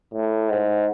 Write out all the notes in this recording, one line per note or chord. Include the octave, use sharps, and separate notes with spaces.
A2
G#2